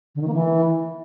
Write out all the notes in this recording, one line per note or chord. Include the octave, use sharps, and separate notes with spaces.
D3
D#3
A#3
E3